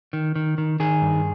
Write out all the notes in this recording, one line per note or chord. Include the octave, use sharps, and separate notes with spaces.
D#3
D#3
D#3
D#3 G#4
G2